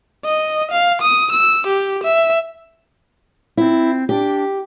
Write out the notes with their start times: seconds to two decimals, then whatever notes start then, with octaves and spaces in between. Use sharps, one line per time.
0.25 D#5
0.71 F5
1.02 D#6
1.32 E6
1.67 G4
2.04 E5
3.57 C4 E4
4.09 D4 G4